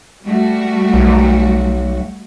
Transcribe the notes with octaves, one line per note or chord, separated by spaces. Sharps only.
G3 A3 F#4
B1